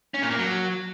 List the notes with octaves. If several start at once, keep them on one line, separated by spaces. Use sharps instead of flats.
C#4
A#2
A#3
F#3